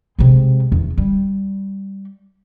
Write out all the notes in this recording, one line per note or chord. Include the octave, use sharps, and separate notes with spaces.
C3 G#3
E2
G3